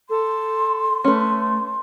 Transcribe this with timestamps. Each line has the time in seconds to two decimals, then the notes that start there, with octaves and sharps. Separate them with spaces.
0.09 A4 C6
1.04 A3 C#4 B4